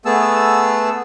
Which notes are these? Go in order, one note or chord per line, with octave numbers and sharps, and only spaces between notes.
A3 B3 G#4 A5 E6